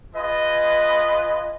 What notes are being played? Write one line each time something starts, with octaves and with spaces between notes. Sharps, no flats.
F4 G#4 B4 D#5